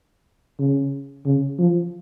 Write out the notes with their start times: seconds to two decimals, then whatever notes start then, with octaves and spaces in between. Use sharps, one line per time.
0.59 C#3
1.25 C#3
1.59 F3